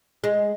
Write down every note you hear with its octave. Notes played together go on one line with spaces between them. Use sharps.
G#3